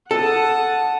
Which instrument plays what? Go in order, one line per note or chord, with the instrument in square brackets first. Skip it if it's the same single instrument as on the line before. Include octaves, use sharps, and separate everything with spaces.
[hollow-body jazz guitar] A4 [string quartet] F#5 A5 D#6